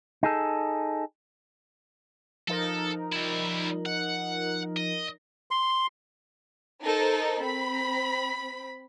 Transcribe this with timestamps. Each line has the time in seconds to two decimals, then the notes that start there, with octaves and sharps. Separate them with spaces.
0.23 D#4 G#4 A4
2.48 F3 D#4 A4 A#4
3.12 G3 E4
3.86 F#5
4.77 D#5
5.51 C6
6.84 D#4 A4 A#4 C5
7.41 C4 B5